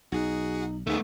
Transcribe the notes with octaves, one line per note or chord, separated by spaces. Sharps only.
B1 D#4 F#4 G#4 F#5
D#2 A3 B3 D#4 G#4